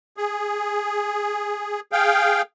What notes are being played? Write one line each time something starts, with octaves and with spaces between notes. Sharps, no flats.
G#4
G#4 F5 G5